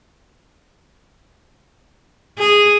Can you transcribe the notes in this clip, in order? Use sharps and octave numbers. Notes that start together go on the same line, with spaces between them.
G#4